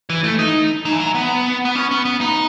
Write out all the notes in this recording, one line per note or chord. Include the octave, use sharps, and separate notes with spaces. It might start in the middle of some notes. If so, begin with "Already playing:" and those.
E3
A3
D#4
F#3
E3
F#3
B3
B3
C#4
B3
B3
D#4